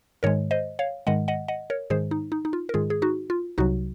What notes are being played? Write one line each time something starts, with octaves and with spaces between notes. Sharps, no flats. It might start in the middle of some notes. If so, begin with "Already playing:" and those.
G#2 D#3 G#3 A#4 C#5
C5 D#5
C#5 F5
G#2 D#3 G#3 D#5 F#5
D#5 F#5
D#5 F#5
A#4 C#5
G#2 D#3 G#3 G#4 C5
D#4
D#4
D#4
F4
A#4
G#2 D#3 G#3 F4 G#4
G#4
D#4 F#4
F4
C2 C3 F#3 D#4 F#4